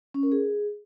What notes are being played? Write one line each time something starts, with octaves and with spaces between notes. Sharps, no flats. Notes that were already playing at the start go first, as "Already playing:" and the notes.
C#4
A#4
G#4